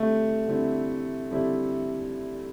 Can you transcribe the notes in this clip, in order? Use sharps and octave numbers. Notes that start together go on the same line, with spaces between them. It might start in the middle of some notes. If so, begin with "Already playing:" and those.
Already playing: D3 G3 A3 C4 E4
D3 G3 C4 E4
D3 G3 C4 E4